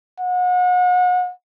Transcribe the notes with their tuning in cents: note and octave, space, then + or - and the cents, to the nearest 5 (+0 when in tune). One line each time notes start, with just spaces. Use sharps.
F#5 -35